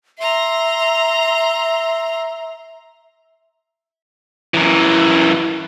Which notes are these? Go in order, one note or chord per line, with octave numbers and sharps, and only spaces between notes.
E5 A#5 C6
F#2 E3